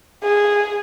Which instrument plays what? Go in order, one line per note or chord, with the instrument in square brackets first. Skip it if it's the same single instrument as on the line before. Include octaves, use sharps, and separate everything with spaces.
[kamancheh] G#4